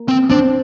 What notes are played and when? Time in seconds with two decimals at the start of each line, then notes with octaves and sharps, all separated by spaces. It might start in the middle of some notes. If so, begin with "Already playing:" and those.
Already playing: A#3
0.08 C4
0.30 C4 D4